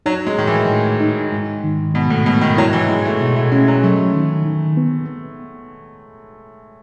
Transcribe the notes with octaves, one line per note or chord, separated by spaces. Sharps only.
F#3 D#4
G#3
A2 D#3
E3
A2
D#4
G#2
D#3
G#2 B2
A2
G#2 B2
D#3
F#3 E4
E3
G#3 E4
A3
B2 A3
A3
G#3 C#4
F#3
F#3 A3
D#3
D#3
B3